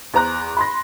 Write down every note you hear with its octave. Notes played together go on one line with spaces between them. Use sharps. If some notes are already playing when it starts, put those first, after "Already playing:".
E2 C5 A#5 F#6
B5 C6 A#6